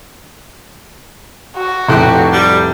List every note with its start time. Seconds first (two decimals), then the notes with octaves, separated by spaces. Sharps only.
1.57 F#4
1.88 F1 A2 G4 F#6
2.32 G3